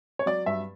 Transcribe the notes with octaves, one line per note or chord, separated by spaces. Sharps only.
C#5
F#3 D5
G2 E5